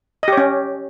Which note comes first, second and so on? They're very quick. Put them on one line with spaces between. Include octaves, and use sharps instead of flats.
D#5 G4 C#5 C#4